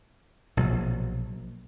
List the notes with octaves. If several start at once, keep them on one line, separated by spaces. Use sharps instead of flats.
A#1 B2 F#3